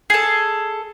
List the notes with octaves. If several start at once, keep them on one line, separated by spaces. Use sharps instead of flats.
G#4 A4